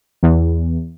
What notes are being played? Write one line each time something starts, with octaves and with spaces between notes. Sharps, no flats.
E2